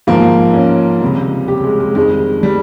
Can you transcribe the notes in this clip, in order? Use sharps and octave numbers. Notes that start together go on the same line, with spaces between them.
G#2 F3 A#3
C#4
C#2 C3 G3
G4
G#3
G#3
F2 D#3 G3 G#3
G3